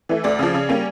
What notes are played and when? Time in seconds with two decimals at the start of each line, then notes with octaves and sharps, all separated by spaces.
0.09 E3 A3
0.24 D2 D5
0.39 C#3 F3
0.54 C#3
0.69 G3 A#3 C#4